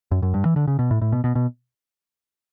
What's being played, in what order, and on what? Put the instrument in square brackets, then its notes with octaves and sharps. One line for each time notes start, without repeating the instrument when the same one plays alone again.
[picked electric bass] F#2
F#2
G2
E3
D3
C#3
B2
A2
A2
B2
B2
B2